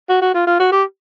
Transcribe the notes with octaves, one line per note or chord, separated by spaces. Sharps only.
F#4
F#4
F4
F4
F#4
G4